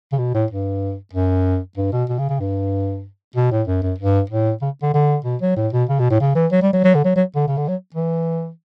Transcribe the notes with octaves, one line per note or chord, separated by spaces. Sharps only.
C#3
B2
A2
G2
F#2
G2
B2
B2
C#3
C#3
G2
B2
A2
F#2
F#2
G2
A2
C#3
D3
D3
B2
F#3
A2
B2
C#3
B2
A2
C#3
E3
F#3
G3
F#3
F#3
D3
F#3
F#3
D3
C#3
D3
F#3
E3